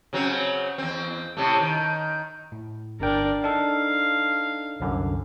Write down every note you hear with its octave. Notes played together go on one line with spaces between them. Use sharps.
C#3 F#3 C4
E2 C4
A2 C3 A3
D#3
A2
G1 D4 A#4 G5
D4 D#4 A4 F5
C2 F#2 D3